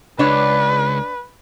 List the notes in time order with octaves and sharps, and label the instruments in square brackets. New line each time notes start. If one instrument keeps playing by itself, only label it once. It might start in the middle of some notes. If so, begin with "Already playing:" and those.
[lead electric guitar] C#2 [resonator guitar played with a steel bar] D4 C#5 D5 [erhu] B4